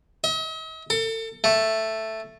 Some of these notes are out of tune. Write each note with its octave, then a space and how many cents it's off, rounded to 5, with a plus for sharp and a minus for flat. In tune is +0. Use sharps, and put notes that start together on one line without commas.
D#5 +45
A4 +35
A3 +5